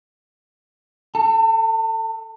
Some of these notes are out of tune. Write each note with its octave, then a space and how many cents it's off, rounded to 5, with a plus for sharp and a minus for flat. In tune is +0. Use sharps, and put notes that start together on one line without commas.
A4 +0 A5 +40